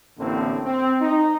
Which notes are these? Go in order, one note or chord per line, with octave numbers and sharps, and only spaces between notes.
A1 A2 D3 A#3 C4
C4
D#4